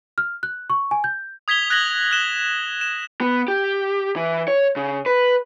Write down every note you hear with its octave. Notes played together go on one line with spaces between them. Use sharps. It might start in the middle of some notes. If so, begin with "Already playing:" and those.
F6
F#6
C#6
G#5
G6
D#6 G#6 B6 F7 G7
F#6 G#6 A#6 F#7 G7
F#6 E7 G7
E7
B3
G4
E3
C#5
C#3
B4